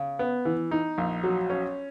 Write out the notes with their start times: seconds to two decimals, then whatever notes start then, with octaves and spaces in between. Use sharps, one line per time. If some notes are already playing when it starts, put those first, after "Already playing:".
Already playing: C#3
0.19 B3
0.45 E3
0.71 D#4
0.98 A#1
1.23 F#3
1.50 C#4